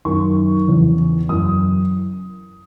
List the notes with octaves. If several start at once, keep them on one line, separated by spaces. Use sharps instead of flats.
F#2 D#3 C#6
E2 C#3 E3
F#2 E3 D#6